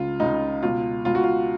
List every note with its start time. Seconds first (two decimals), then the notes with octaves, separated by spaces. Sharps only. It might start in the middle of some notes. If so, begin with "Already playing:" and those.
Already playing: C#2 C#3 F4
0.20 C#2 C#3 D#4
0.62 C#2 B2 F4
1.05 C#2 B2 F4
1.15 F#4
1.24 F4